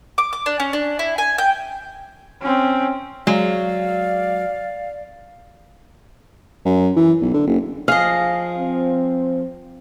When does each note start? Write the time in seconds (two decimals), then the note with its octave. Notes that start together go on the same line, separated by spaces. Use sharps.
0.18 D6
0.33 D6
0.46 D4
0.60 C#4
0.73 D4
0.99 E4
1.18 G#5
1.38 G5
2.41 C4 C#4
3.27 F#3 G#3 D5 F5
6.65 F#2
6.96 E3
7.21 B1
7.34 D3
7.47 F#1
7.88 F3 G#4 D#5 F5
8.57 C4